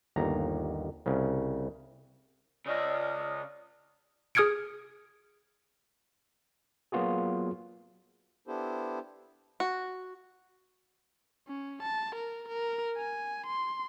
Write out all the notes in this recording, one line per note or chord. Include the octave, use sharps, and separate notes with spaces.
G1 D#2 A#5
C2 C#3
C#3 D5 D#5 D#6 F6
G#4 D#6 F6 G#6 C#7 D7
F#3 A#3 B3 F4 F#4 G#4
B3 D4 E4 G4 A4 C5
F#4
C#4
A5
A#4
A#4
G#5
C6